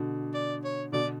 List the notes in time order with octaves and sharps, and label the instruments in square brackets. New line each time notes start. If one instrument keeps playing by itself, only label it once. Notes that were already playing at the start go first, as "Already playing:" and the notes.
Already playing: [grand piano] B2 D3
[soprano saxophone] D5
C#5
[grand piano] B2 D3 [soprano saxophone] D5